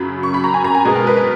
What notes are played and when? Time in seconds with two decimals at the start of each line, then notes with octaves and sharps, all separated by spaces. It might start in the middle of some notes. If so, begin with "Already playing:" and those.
Already playing: F#2 C#3 F#3 B5
0.23 C#6
0.34 B5
0.44 A#5
0.54 G#5
0.64 A#5
0.75 G#5
0.85 B2 G#3 B3
0.95 A#4
1.07 B4
1.17 B4